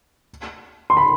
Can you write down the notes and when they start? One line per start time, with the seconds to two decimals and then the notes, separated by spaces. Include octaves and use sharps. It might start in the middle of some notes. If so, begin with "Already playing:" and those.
0.90 C6
0.97 B5